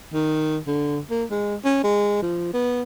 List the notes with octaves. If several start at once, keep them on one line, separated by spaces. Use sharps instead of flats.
D#3
D3
A#3
G#3
C#4
G#3
F3
B3